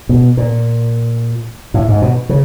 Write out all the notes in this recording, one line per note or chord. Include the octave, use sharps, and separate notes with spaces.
B2
A#2
A2
G#2
B2
C#3